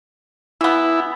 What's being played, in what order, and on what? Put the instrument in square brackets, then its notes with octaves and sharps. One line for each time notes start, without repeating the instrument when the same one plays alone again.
[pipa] E3 B3 [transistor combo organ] E4